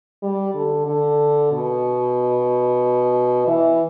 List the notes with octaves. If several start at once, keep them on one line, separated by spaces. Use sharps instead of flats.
G3
D3
D3
B2
E3